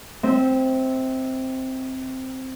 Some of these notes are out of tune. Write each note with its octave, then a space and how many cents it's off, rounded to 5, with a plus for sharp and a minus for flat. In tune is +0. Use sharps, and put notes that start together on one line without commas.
C4 +0 E5 -35